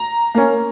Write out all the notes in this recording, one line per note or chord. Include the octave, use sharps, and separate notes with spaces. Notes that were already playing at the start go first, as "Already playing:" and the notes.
Already playing: A#5
A#3 C#4